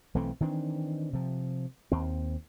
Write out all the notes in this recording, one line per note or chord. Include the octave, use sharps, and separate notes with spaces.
B1 E3 A3 C4
D#3 E3 C4 D4
C3 F3
D#2 C4